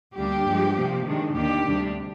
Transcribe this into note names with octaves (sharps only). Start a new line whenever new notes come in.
D2 D3 G3 A#3 D4 G4
G2 F3 G#3 D4
C3 F3 A#3
C3 D#3 G#3 D4
D#2 D#3 A#3 D4 G4
D2 C3 G3 D4